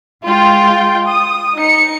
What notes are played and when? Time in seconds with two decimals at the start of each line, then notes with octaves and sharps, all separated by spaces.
0.24 G#3 F4 G5
1.07 D#6
1.57 D#4 C#7